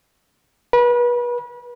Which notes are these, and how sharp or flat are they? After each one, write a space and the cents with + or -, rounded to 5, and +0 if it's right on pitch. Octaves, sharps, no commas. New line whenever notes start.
B4 -30